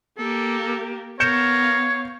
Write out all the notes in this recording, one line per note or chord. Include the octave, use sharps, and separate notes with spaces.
A#3 G4 A4
B3 A#4 C#5 F5 G6 C#7 E7